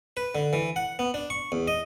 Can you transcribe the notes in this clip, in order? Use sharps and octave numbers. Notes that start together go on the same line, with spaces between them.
B4
D3
E3
F#5
B3
D4
C#6
E2
D#5